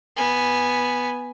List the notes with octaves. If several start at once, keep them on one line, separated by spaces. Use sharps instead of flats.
B3 G#5